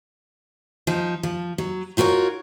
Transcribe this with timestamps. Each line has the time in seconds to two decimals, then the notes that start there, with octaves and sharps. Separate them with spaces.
0.87 F3 D#4
1.23 F3
1.58 F#3
1.97 D#4 F4 F#4 A#4 C#5